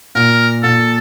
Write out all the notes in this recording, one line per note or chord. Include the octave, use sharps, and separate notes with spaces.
A#2 A#4
A#2 A4